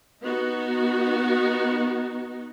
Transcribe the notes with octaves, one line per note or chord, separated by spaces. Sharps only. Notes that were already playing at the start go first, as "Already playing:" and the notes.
B3 D#4 F#4